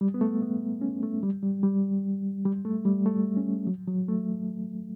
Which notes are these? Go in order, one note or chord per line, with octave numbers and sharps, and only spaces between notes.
G3
B3
A3
B3
C#4
A3
G3
G3
G3
G3
A3
G3
A3
C#4
F#3
F#3
A3